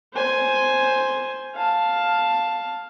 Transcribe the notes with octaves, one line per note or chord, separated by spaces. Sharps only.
C5 G#5
F5 A5